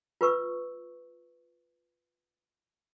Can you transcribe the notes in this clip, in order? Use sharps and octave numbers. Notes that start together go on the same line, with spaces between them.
F4 B4 C#6 E6